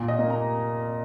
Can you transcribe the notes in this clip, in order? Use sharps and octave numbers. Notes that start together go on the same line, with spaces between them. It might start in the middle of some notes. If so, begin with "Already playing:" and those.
Already playing: A#2
D#5
A#3
A#5